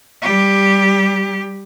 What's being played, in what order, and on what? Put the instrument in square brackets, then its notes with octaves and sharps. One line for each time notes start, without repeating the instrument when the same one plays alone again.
[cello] G3 G4